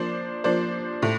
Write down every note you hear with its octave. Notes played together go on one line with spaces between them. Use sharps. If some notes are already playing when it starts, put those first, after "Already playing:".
Already playing: F3 A#3 D4 C5 D5
F3 A#3 D4 C5 D5
A2